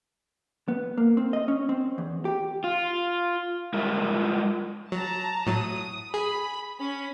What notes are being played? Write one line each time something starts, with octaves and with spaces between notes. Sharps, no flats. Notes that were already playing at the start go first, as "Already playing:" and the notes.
B3
A#3
C4
D#5
C#4
C4
E2
G4
F4
G3 G#3 F4 A#4 E5
F#3 A5 A#5
A2 F#3 D#6
G#4 B5
C#4 B5